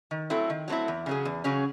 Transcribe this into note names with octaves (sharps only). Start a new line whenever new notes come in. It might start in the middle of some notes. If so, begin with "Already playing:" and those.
D#3
F#3 A3 C4 E4
D#3
F#3 A3 C4 E4
E2
C#3 F#3 C#4 G#4
E2
C#3 F#3 C#4 G#4